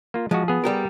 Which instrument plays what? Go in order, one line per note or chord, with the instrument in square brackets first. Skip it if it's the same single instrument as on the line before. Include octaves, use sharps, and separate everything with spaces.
[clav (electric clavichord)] A#3 F4
[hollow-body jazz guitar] F3 [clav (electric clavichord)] G#3 F#4
[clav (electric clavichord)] B3 G#4
[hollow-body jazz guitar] G3 G4 A#4